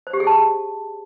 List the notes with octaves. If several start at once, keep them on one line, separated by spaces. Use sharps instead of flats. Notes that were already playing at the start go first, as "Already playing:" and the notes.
C5
G4
G#4
A5